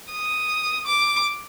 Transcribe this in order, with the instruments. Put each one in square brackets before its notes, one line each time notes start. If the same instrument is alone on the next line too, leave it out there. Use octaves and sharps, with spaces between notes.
[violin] D#6
D6